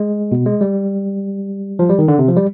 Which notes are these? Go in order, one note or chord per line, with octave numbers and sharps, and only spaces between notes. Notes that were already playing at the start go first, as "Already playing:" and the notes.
Already playing: G#3
B2
G#3
G3
F3
G3
D#3
D3
C3
F3
G3